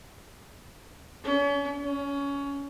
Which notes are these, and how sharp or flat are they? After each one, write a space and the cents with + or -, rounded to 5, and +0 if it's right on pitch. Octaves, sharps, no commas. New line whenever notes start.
C#4 +40
C#4 +20